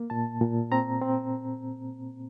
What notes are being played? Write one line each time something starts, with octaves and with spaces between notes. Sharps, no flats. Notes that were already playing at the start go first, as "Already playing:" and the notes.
Already playing: A#3
A#2 A5
A#2
C4 A#5
C4